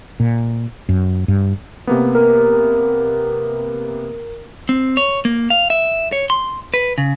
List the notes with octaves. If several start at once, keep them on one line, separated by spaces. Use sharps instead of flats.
A#2
F#2
G2
C3 A#3 B3
A#4
C4
C#5
A#3
F5
E5
C#5
C6
B4
C#3